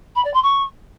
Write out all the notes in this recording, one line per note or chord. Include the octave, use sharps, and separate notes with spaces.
B5
D5
C6
C#6